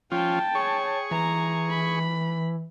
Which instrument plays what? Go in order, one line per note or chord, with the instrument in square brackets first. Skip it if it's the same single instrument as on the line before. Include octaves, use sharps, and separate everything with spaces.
[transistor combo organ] F3 C#4 F4 [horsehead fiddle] G5 A5
[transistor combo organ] G#4 C#6 [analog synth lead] C#5
[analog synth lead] E3 [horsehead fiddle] A#5
[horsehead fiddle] B5